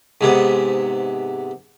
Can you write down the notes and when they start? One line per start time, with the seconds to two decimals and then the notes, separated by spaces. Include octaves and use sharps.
0.21 G#2 C3 B3